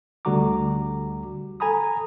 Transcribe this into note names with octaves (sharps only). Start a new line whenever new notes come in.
D2 D3 G3 F#4 A#5 D6
A4 G#5 A#5 B5 D#6